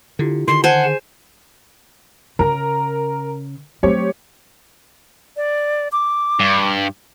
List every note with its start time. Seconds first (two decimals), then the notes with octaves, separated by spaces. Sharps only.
0.19 D3 E4 F4 G4
0.48 D3 D#3 C6
0.64 C5 F#5 G#5 A5 G#6
0.84 G#4 E7
2.39 C#3 A#4 A#5
3.83 F#3 A3 C4 G4 C#5
5.37 D5
5.92 D6
6.40 G2